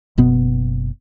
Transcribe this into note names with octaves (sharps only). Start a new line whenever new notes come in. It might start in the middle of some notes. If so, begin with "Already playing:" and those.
F#1 B2 B3